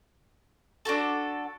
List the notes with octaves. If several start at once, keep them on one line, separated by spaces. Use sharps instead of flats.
D4 F#4 A4